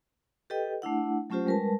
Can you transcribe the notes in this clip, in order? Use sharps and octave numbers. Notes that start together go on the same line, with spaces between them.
G4 A4 B4 D#5 G5
A3 D4 E4 F#5
F#3 A3 C#4 F4 G4 C5
G3 G#3 A#4 B4 A5